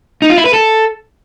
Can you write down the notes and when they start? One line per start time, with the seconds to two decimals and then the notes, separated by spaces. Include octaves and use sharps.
0.22 D#4
0.30 F4
0.38 E4
0.46 B4
0.53 A4